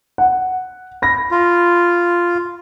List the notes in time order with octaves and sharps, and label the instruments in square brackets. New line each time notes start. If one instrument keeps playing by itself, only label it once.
[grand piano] F#5
B5 A#6
[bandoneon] F4